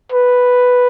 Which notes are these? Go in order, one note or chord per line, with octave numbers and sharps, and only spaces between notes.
B4